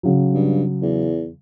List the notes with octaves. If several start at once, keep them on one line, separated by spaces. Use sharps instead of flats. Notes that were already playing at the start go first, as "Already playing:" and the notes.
C#3 F#3
G2
E2